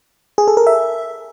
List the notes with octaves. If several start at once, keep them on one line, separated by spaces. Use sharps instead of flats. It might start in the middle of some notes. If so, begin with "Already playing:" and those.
G#4
A4
A#4
E5